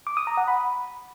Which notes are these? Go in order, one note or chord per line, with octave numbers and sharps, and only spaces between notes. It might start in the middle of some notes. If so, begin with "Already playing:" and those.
D6
D#6
A#5
F#5
B5